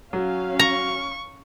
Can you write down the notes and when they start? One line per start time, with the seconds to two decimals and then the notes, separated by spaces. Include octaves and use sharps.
0.13 F#3 C#4 F5
0.59 A#5 C#6